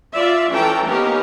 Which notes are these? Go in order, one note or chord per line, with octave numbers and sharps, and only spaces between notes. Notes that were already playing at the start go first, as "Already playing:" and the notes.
F4 D5 E5
E3 C#4 A4 G5 A#5
A#3 B3 C#4 D#4 G4 A#4